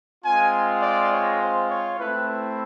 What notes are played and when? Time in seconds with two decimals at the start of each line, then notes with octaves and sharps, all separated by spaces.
0.24 G#3 C4 F4 G#5
0.82 D5
1.12 C#5
1.42 C5
1.70 C#5
1.99 A3 C4 E4 B4
2.29 B4